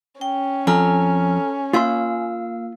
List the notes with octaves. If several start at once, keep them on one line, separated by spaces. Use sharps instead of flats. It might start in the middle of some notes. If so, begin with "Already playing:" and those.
C#4 G5
F2 A4 G#5 A#5 F6
A#3 F4 E5 F5 C6 E6